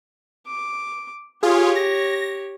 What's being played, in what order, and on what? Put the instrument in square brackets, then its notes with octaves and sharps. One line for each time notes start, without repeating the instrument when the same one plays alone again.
[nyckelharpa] D6
[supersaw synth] F4 G#4 [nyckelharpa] G4 C#5
[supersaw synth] A#6